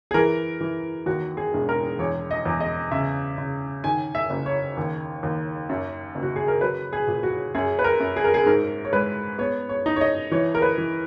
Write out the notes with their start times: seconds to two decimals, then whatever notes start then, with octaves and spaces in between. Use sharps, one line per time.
0.11 G#4
0.14 E3 A#4
0.61 E3
1.06 D#2 F#4
1.37 G#4
1.54 E1
1.69 A#4
1.99 E2 C#5
2.31 D#5
2.46 E2
2.60 D#5
2.91 C#3 E5
3.38 C#3
3.84 D#3 G#5
4.15 E5
4.30 F#1
4.46 C#5
4.77 D#2
5.23 D#2
5.69 F#2
6.15 F#1
6.23 F#4
6.36 G#4
6.48 A#4
6.61 F#3 B4
6.93 G#4
7.07 A#2
7.23 F#4
7.54 F#2 G#4
7.79 B4
7.84 A#4
8.00 F#2
8.16 G#4
8.24 A#4
8.34 G#4
8.46 G#2 A#4
8.85 C#5
8.93 G#3 B4
9.38 B3 C#5
9.69 C#5
9.86 D#4
9.96 C#5
10.01 D#5
10.31 E3 C#5
10.55 A#4
10.62 B4
10.78 E3